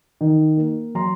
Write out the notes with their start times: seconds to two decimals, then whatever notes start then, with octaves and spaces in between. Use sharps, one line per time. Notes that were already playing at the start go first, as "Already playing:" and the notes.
0.21 D#3
0.57 A#3
0.95 F#3 A#5 C6